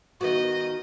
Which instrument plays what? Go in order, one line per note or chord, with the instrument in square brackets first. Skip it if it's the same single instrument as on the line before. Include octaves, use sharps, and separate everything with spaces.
[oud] D#3 B3 F#4 [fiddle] D#5